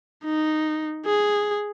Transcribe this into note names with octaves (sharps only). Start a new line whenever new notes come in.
D#4
G#4